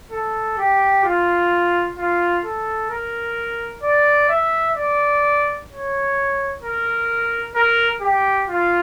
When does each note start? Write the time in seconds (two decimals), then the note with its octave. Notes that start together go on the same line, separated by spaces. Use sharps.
0.12 A4
0.58 G4
1.05 F4
1.97 F4
2.44 A4
2.90 A#4
3.83 D5
4.29 E5
4.77 D5
5.69 C#5
6.62 A#4
7.55 A#4
8.01 G4
8.48 F4